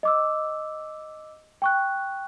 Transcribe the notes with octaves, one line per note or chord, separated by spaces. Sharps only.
D#5 D6 E6
G5 C#6 F#6